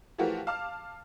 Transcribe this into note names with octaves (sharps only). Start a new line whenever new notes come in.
E3 F3 A3 F#4 G4 A#4
F5 A5 D6 F6